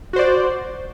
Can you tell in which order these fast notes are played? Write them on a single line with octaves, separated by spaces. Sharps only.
F#4 C5 D5